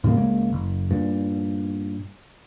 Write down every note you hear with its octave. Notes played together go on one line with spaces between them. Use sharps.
A2 C#3 G3 A#3
C#2 G#3 A#3
F#1
G2 A#2